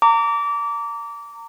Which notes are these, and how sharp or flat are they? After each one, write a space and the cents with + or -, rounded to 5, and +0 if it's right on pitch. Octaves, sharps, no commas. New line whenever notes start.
A#5 -30 D6 -25